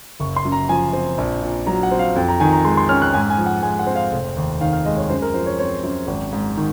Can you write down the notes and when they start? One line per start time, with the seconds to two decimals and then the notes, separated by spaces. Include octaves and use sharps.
0.20 F#1 C#6
0.36 C6
0.45 F#2
0.52 A#5
0.69 F3 G#5
0.93 C4
1.18 A#1
1.42 A#2
1.67 F#3 A#5
1.83 F#5
1.91 C4
1.99 F5
2.16 F2
2.28 A#5
2.40 D#3 G#5
2.53 A#5
2.64 G#3 C6
2.77 C6
2.89 C#4 F6
3.02 F#6
3.14 G#2 G#5
3.30 G#5
3.38 F3
3.46 F#5
3.63 G#3 G#5
3.79 F#5
3.87 C4
3.95 F5
4.12 F1
4.37 D#2
4.61 D#3 F5
4.73 F5
4.85 G#3 D#5
4.97 C#5
5.10 F#2 C5
5.22 A#4
5.34 F3 C5
5.46 C#5
5.59 C4 C#5
5.83 F#2
6.07 G#1
6.32 G#2
6.57 D#3